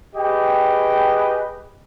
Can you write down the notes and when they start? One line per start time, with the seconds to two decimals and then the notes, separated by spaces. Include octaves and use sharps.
0.15 G4 G#4 B4 D#5 G5